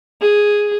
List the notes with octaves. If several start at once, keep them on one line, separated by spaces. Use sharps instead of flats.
G#4